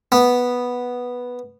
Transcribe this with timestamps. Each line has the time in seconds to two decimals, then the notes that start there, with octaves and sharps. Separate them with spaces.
0.12 B3